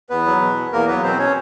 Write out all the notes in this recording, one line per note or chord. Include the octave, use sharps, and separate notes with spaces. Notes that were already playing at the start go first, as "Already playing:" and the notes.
E2 B3 B4
F#3
B2
E2
E2 A#3 A#4
F#3 B3 B4
B2 C4 C5
C#4 C#5